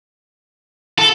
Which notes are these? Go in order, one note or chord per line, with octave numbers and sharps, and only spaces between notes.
A4